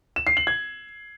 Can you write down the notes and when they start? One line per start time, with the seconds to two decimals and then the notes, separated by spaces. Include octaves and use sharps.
0.16 E7
0.27 C7
0.37 F#7
0.47 G#6